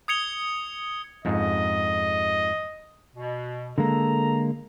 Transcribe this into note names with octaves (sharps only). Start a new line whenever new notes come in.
D#6 G#6 C#7 F7 G7
F2 G#2 D#5
B2
D3 G#3 A#3 A4 A#5